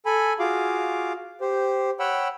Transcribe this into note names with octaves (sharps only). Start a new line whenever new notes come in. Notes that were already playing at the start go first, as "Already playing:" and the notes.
A4 G#5 B5
F4 F#4 G#4 F5 D6
G4 C5
C#5 F#5 G5 B5 E6